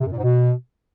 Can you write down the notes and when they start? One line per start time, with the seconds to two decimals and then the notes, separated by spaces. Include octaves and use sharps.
0.01 C3
0.06 F#2
0.12 A#2
0.17 G#2
0.23 B2